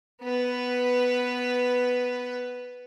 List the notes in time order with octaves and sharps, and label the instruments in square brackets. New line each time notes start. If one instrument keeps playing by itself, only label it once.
[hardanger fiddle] B3 B4